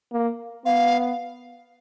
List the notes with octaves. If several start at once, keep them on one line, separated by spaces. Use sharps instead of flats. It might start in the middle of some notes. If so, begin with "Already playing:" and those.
A#3
B3 F5